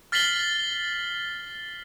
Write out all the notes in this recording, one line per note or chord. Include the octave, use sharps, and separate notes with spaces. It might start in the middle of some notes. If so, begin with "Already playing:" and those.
F6 A6 B6 C7 F#7 G7